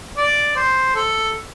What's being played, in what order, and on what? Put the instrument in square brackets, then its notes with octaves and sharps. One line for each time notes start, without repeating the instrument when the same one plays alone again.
[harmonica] D5
C5
A4